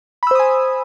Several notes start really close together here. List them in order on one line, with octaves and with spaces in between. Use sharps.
B5 E6 C5 D#6 G#5